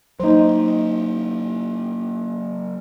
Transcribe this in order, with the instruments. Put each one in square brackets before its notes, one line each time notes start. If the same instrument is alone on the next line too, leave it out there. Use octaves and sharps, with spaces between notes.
[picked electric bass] F#3 A#3 [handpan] D#4 C5